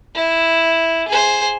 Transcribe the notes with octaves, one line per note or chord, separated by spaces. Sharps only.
E4
G#4 C5